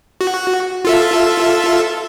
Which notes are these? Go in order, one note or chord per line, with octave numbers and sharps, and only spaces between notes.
F#4
F4 A4 E5